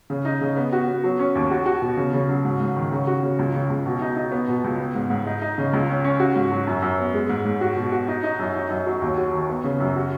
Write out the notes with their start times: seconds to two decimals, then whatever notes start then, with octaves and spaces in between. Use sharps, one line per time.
0.10 C#3
0.25 D#4
0.41 C#3
0.57 B3
0.73 F#4
0.88 B3
1.04 F#3
1.19 C#4
1.35 D#2
1.51 F#4
1.66 F#4
1.82 B2
1.97 C#3
2.13 C#3
2.29 F#3
2.44 G#2
2.60 G#2
2.76 D#3
2.92 C#3
3.07 F#4
3.23 C#3
3.39 C#2
3.54 C#3
3.70 C#2
3.86 B2
4.01 D#4
4.16 D#4
4.32 B3
4.48 B2
4.64 C#2
4.79 B3
4.95 G#2
5.10 G#2
5.26 D#4
5.41 D#4
5.58 C#3
5.73 C#2
5.89 C#4
6.04 C#4
6.20 F#4
6.36 G#2
6.51 F#3
6.67 F#2
6.82 F#2
6.98 B3
7.14 G#3
7.29 G#2
7.45 G#2
7.61 F#4
7.77 B2
7.92 F#4
8.08 D#4
8.23 D#4
8.39 F#2
8.55 D#4
8.70 F#2
8.86 F#3
9.01 D#2
9.17 F#4
9.33 D#3
9.49 B3
9.64 C#3
9.80 F#2
9.96 F#4